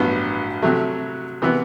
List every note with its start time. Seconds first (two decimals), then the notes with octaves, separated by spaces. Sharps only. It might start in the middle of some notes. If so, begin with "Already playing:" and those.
Already playing: A1 G2 F#3 B3
0.62 C3 F#3 A3
1.42 C3 E3 B3